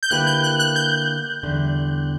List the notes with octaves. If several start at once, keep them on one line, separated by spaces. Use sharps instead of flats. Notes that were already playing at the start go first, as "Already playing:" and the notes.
G6
D3 A#3 E4 G4 B4 F#6
G6
F#6
F#6
G6
E2 D3 G3